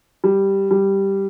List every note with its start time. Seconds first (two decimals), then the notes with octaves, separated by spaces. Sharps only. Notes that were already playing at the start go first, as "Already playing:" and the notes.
0.24 G3
0.71 G3